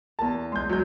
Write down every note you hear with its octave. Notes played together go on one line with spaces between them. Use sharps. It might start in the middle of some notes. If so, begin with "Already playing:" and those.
E2 A#4 A5
G#3 C6 G6
F#3 G6